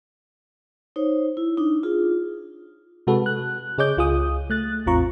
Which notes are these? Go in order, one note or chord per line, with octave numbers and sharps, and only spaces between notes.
D#4 C5 C#5
E4
D4 D#4
F4 G#4
C3 G#3 F#4 A4 B4
F#6
C#3 G#4 C#5 D#5 D6 G6
C#2 F4 G#4 D#6
A3 F#6 A6
A1 E2 C4 F4 A#5 C#6